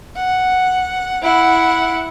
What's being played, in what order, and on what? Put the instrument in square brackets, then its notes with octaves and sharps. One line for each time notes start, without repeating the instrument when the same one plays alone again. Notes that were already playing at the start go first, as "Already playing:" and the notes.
[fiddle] F#5
E4 F#5